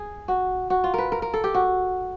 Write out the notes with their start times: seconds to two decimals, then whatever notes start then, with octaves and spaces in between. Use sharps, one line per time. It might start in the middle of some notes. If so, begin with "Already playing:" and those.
Already playing: G#4
0.28 F#4
0.70 F#4
0.84 F4
0.94 A#4 B4
1.12 A#4
1.22 A#4
1.34 A4
1.44 G4
1.54 F#4